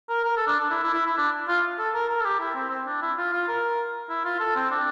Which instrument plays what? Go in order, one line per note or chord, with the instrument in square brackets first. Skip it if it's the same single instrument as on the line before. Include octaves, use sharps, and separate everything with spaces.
[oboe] A#4
A#4
A4
D4
D4
E4
E4
E4
E4
D4
F4
A4
A#4
A#4
A4
G4
E4
C4
C4
D4
E4
F4
F4
A#4
E4
F4
A4
C4
D4